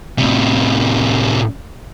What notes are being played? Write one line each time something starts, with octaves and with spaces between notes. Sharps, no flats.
A2 C3